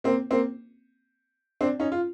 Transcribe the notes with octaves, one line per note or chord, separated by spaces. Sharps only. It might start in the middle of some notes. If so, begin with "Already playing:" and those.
A#3 C4
A#3 C4
C4 D4
C#4 D#4
F4